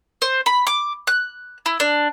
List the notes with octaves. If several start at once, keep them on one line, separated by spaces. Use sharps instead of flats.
C5
B5
D6
F#6
E4
D4